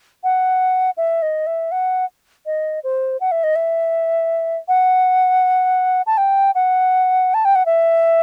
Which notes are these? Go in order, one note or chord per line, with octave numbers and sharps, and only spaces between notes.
F#5
E5
D#5
E5
F#5
D#5
C5
F#5
E5
D#5
E5
F#5
A5
G5
F#5
A5
G5
F#5
E5